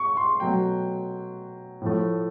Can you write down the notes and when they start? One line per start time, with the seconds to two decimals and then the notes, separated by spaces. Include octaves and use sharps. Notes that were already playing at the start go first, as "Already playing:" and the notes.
Already playing: C#6
0.17 C6
0.40 B2 F#3 A3 G5
1.82 A2 F3 A3